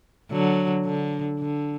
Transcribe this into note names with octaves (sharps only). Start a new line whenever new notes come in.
D3 F#3
D3
D3